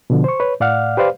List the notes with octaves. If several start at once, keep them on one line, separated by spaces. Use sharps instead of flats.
B2 D3 F3
C5 C#6
B4 C#5
A2 D5 F5 F#5 F6
G4 B4 C5 D5 F5